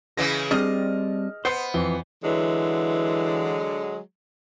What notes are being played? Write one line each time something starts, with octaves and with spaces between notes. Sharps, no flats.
C#3 E3 G#3 A#6
G3 C4 D4 D#5 F6
B3 C5 C7
F2 E3 G7
D3 E3 F#3 G#3